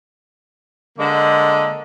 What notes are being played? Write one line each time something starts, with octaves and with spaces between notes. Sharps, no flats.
D3 G#3 A#3